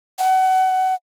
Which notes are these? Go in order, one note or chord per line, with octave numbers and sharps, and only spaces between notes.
F#5